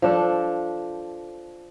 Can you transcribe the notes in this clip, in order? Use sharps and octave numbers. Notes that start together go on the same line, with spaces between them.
F3 D4 A4